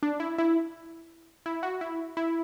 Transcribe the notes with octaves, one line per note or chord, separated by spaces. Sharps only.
D4
E4
E4
E4
F#4
E4
E4